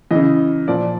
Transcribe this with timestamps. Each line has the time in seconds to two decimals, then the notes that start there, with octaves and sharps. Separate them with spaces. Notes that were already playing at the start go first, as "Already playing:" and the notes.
0.11 C#3 E3 D#5
0.68 A#2 F3 D5